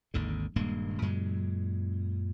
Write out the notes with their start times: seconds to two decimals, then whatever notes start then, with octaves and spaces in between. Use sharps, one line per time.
0.14 G#1 D#2 D3
0.56 D#1 G2 G#3 A#3
1.02 F#2 A#2 C#3 G#3